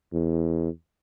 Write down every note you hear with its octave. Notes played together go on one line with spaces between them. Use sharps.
E2